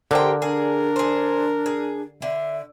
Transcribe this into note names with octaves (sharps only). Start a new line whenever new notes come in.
D3 G4 A#4 C5 G5
D4 G#4 A#4
G#4 C5
G#4
D3 E5